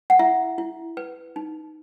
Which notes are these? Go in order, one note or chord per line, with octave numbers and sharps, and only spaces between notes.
F#5
E4 E5
E4
B4
D#4